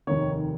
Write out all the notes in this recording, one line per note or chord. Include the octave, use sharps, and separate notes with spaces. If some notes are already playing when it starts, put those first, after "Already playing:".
F1 D#2 D#3 C#5